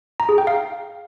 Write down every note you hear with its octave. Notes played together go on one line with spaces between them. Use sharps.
A#5
G#4
G5
F5